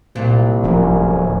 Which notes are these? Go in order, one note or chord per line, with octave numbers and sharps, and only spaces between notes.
C2 A#2 F#3 C4
D1 F3 C#4 A#4